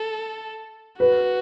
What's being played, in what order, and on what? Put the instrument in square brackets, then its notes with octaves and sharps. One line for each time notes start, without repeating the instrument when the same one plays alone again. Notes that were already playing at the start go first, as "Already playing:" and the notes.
Already playing: [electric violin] A4
[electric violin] F#4 [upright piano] B4